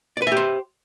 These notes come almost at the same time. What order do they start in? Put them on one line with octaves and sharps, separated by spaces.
D5 B4 E5 G4 C5